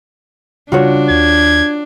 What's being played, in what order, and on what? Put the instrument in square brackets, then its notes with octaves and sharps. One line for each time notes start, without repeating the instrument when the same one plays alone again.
[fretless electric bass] C#3 G3 [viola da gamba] D4 [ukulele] F4 F#4 C#5
[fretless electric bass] D#2 [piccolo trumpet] G#6